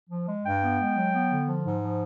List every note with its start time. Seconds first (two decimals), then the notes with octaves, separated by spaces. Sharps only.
0.10 F3
0.27 G#3
0.44 G2 G5
0.61 B3
0.79 G#3
0.96 F#3
1.13 B3
1.30 D3
1.48 F3
1.65 G#2
1.82 F3